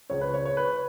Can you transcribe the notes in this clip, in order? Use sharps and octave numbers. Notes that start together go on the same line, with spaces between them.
C#2 C#3 C#5
B4
C#5
C#5
B4